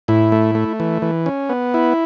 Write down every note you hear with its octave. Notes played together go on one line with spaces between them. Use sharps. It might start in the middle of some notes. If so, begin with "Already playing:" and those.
A2 E4
A3
A3
E3
E3
C#4
B3
E4